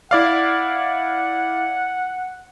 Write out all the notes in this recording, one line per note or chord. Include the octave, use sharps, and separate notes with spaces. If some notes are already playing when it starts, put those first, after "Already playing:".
E4 D5 F5 F#5